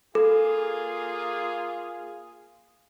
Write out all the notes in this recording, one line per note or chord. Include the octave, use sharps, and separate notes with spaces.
A#3 F4 G#4 A4